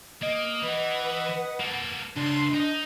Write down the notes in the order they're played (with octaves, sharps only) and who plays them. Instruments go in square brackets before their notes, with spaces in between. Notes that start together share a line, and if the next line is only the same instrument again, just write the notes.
[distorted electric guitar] A#3 [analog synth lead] D#5
[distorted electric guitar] E3 [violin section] B4 F#5
[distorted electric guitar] A#3 A4
[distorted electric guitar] C#2 [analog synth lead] D4 [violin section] C6
[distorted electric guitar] D#4 [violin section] D#5